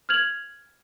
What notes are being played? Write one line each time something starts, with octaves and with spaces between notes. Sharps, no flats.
F6 G6 G#6 F7 F#7